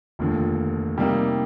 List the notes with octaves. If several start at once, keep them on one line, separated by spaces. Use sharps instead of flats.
F1 D#2 D3 F3
C3 G3 A#3 D#4